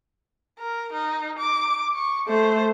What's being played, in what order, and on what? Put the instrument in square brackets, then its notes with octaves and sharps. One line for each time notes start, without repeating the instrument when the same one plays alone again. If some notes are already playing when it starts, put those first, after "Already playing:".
[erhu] A#4
D#4
D6
C#6
[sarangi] A3 [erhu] C5